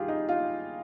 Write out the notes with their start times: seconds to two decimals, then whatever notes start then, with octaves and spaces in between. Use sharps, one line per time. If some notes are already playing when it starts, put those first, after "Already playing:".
Already playing: D#2 G3 F4 G4 G#4
0.08 D#4
0.28 F4